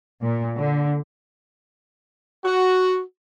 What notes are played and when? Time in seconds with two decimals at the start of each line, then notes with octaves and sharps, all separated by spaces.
0.22 A#2
0.56 D3
2.44 F#4